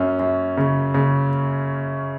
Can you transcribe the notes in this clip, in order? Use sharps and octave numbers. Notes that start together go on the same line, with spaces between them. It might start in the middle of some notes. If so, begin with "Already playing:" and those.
Already playing: F#2 C#4
F#2
C#3
C#3